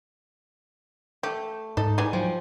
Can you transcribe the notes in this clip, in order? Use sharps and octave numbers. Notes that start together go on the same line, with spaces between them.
A3 G4
G#2 D#4 A4 D#5
E3 G3 G#3 G#5
F3 F#3 G5